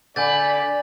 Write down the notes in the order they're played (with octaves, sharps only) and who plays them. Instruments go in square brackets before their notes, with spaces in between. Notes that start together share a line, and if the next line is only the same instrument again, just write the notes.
[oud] D3 [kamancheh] D5 B5 [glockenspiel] G#5 G6 A6